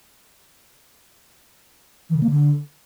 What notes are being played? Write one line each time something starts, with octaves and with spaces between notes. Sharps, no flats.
E3
C#3
A#3
D3